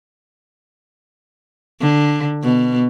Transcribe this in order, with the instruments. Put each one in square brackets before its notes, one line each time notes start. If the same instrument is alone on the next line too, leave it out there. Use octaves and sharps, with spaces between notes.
[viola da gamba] D3
B2